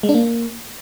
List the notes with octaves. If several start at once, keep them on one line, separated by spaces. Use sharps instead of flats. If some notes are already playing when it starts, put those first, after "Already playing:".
G#3
D4
A#3